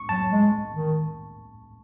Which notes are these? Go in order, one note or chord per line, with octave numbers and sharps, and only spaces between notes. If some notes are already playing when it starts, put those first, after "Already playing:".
Already playing: C#6
F#3 A5
G#3
D#3